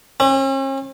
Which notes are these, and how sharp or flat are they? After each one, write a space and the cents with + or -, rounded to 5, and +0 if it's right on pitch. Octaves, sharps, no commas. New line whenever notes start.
C#4 -45